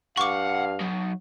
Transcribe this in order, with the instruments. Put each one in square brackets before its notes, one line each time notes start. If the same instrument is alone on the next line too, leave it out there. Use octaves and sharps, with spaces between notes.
[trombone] G2 [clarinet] F5 [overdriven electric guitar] F#5 [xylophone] C#6 D6
[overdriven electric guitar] F#3 D#4